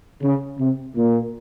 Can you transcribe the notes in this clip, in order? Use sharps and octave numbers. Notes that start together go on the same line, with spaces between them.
C#3
C3
A#2